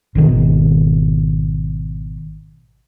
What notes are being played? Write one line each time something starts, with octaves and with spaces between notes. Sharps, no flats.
G#1 B2 D#3